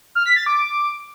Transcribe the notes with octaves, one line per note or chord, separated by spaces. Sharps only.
F6
B6
A6
D6